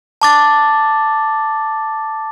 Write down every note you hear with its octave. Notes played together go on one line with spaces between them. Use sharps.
A5 D6 A6